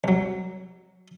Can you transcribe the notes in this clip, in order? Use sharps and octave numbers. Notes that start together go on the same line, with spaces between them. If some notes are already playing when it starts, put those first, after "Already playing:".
C2 F#3